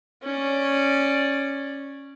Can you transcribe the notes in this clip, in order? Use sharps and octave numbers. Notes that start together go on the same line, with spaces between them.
C#4 D5